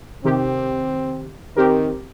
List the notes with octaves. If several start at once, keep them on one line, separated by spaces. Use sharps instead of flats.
C3 D#3 C4 G4
D#3 C4 G4 A#4